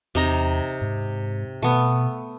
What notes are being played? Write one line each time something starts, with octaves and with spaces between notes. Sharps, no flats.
E2 C3 D#4 A#5
G#2
B2 A3 B3